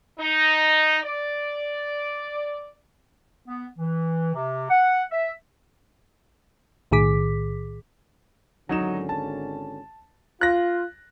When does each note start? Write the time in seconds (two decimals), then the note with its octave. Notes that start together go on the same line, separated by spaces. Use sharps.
0.19 D#4
1.02 D5
3.46 B3
3.78 E3
4.34 C3
4.70 F#5
5.11 E5
6.91 B1 A2 D#3 G#4 D6 B6
8.69 G#1 D3 F#3 C#4 D#4 E7
9.09 A5
10.41 F4 F#6 A#6